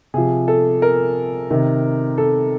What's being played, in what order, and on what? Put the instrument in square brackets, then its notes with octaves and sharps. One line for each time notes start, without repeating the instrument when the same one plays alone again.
[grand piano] C3 F3 G#4
A4
A#4
C3 D#3
A4